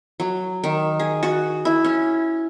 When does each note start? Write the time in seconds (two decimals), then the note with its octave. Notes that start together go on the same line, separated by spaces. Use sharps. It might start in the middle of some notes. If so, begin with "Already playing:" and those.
0.20 F#3
0.64 D#3
1.00 G#4
1.23 F#4
1.65 E4
1.84 C#4